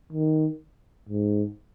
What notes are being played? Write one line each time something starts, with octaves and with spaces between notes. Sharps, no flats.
D#3
G#2